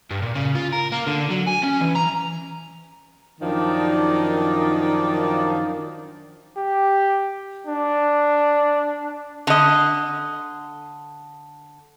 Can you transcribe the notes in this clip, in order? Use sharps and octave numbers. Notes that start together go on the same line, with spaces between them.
G2
A#2
C#3
F4
A#4
A#3
D3
F#3
G#5
C#4
E3
A#5
F#2 D#3 F3 D4 D#4 D5
G4
D4
D3 D#5